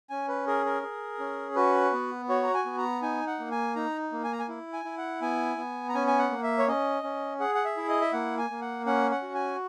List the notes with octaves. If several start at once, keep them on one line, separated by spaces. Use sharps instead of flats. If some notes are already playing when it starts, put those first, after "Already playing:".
C#4 G#5
B4
G#4 A#4
A#4
G#4
C#4
F#4 B4
B3
F#4 C#5
A#5
G#5
B3
A#5
D#4 G#5
F#5
A#3
G#5
D#4 A#5
A#3
G#5
A#5
G#5
E4
G#5
E4
F#5
B3 G#5
B3
A#5
C#4 G#5
G#5
F#5
A#3
E5
C#5
C#4 D#5
C#4
G#4 F#5
F#5
E5
E4
D#5
E5
A#3 F#5
G#5
A#3
F#5
C#4 F#5
F#5
F#4
G#5